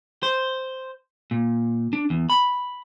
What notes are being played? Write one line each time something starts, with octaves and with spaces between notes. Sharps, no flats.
C5
A#2
D4
E2
B5